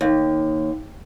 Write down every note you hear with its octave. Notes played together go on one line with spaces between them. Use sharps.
D#2